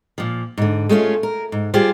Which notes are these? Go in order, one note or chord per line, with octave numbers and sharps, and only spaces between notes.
A#2 F3
G#2 D3
G#3 A3 C#4 F4
A#4
G#2
G3 F4 G4 G#4 C5